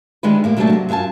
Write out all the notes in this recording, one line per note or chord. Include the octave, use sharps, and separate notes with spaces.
D#3 E3 G3 G#3 D4 B4
A2 A#3 G4
C3 F#3 A3 A#3 D4 A5
C3 F#3
F#2 F4 E5 G#5 A5